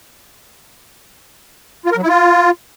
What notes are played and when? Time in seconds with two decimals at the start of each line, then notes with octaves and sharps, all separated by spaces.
1.86 F4
1.92 A#4
1.97 F#3
2.03 E4
2.08 F4